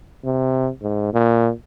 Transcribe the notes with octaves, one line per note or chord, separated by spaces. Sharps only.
C3
G#2
A#2